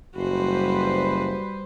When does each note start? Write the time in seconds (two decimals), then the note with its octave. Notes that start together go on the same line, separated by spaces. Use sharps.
0.16 F#1 G3 F#4 B4 C5